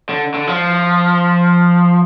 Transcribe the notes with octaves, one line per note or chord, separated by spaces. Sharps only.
D3
D3
F3